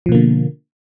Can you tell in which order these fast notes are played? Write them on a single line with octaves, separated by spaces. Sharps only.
F3 B2 A#3 D3